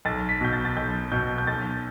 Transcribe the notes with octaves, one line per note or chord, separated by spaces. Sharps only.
B1 A6
B6
B2 G6
A6
A6
B1 G6
B2 G6
G6
B1 A6